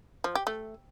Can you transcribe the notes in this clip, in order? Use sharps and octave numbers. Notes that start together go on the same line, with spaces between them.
F3
G4
A3